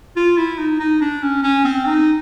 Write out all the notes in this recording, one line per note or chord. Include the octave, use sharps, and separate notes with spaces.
F4
E4
D#4
D#4
D4
C#4
C#4
C4
D#4